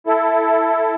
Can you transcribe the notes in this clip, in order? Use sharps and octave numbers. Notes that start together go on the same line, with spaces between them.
E4 A4